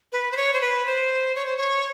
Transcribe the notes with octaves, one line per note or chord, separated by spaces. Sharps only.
B4
C5
C#5
C5
B4
C5
C#5
C5
C#5